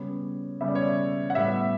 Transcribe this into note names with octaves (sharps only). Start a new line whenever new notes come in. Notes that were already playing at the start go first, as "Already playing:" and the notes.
Already playing: C#3 G3 B3 C#5
C#3 G3 B3 E5
D5
C#5
D5
F#5
A2 G3 B3 E5